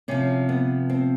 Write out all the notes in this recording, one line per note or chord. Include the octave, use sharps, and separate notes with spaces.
C3 F3 C#4
B3
C4